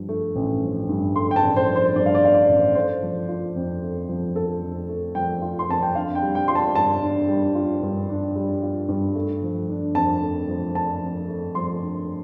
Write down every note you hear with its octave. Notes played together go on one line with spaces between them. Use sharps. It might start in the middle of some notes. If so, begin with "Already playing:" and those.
Already playing: G2 F3
A3
A1
F3
G2
A3 C6
G5
A5
A1
C5
F3
C5
G2 D5
F5
D5
A3 F5
D5
A1
A3 C5
F3
F4
F2
A3
F3
F4 A4
F2
A3
F3 G5
F4
C6
F2 A5
G5
D4 F5
G5
G3
G5
F4 C6
A5
G2 A5
D4
G3
F4
G2
D4
G3
F4
G2
A3
F3
D4
F2 A5
A3
F3
D4 A5
F2
A3
F3 C6
D4